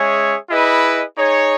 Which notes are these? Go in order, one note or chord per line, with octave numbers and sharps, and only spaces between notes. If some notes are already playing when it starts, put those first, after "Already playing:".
Already playing: G#3 C#4 G#4 C#5 E5
E4 G#4 B4 D#5
D#4 G#4 C#5